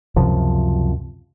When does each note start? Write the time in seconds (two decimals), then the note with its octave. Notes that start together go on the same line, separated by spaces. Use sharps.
0.16 C#2 F#2 C3 F3